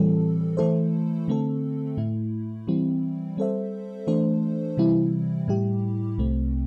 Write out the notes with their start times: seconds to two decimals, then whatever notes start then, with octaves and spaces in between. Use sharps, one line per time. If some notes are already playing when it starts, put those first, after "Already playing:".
Already playing: A2 E3 G3 C4 A4
0.57 E3 A3 E4 A4 C5
1.28 D3 A3 C4 A4
1.97 A2 A3 E4
2.67 E3 G3 C4 E4
3.37 G3 C4 A4 C5 E5
4.07 E3 A3 D4 A4 C5
4.77 C3 E3 G3 C4 E4
5.48 A2 G3 E4 G4
6.18 C2 C3 A3 C4